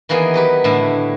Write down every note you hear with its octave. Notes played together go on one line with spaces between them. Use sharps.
D#3 E3 A#3 B3 G#4
F#3 G4 B4
A2 D3 G3 E4